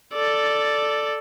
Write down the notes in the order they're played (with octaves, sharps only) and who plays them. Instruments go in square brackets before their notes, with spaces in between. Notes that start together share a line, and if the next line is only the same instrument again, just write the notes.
[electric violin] A4 D5